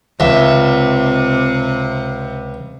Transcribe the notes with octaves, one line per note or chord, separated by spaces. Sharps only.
C#2 C3 E5